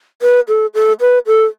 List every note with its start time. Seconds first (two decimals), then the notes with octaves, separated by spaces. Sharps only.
0.22 B4
0.48 A4
0.74 A4
1.00 B4
1.27 A4